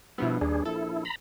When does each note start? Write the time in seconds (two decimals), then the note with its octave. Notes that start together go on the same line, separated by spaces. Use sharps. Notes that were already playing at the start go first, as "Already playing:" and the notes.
0.18 G2 B2 F3 B3 E4
0.41 D#2 D4 G#4
0.65 A#1 E4 A4
1.05 A#5 B5